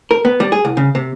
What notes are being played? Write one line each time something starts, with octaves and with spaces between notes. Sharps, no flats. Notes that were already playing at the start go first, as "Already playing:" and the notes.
A#4
B3
G3
G#4
C2
C#3
C3